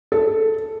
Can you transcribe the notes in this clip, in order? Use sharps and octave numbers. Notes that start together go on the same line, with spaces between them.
A4